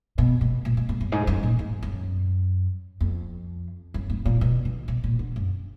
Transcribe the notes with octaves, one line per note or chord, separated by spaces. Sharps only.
B2
B2
A#2
B2
G#2
F#2
G#2
F#2
A#2
G#2
F#2
F2
F#2
G#2
A#2
B2
D3
B2
A#2
D3
F#2